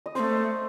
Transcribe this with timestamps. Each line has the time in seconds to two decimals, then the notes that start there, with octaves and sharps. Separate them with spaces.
0.06 D#5
0.15 C4 C5
0.19 A3